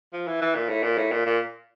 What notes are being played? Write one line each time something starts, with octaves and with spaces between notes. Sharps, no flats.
F3
E3
E3
A#2
A2
A#2
A2
A#2
A#2